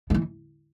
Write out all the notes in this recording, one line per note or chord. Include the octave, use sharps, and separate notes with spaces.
F3
E3